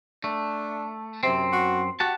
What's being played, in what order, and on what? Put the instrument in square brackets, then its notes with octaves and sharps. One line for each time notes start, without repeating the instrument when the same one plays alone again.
[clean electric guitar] A3 [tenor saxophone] D4
[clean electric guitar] F#2 C4 [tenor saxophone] C3
[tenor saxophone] F#4
[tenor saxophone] F#4 [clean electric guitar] G4 F#5 A5